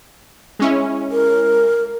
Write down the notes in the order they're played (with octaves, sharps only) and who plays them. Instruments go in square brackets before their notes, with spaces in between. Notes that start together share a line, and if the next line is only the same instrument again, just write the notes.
[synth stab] G#3 C#4 E4
[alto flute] A#4